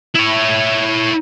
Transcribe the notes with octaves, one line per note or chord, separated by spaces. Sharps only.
E4 C#5